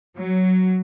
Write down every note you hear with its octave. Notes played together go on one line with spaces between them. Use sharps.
F#3